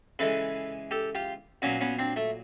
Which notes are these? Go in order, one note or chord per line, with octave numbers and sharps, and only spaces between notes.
C#3 E3 G#3 A4 B4
G4 A4
F4 G4
A#2 F#3 B3 C#4
B3 C#4
C4 D4
A3